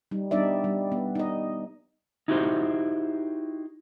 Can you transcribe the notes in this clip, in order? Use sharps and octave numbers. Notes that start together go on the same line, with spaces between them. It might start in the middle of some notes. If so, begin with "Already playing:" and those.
G3 D#4
G3 B3 D4 D#4 D5 E5
G3
B3
D#4 D#5
D#4 E4 F#4 G4 A4 C5